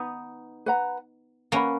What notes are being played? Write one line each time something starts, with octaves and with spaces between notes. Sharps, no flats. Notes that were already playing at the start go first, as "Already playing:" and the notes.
Already playing: B3 D#4
B4 F#5 A#5
A#3 C#4 B4 F#5 B5